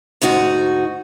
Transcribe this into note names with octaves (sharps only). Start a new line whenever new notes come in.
D2 G#2 D#4 F#4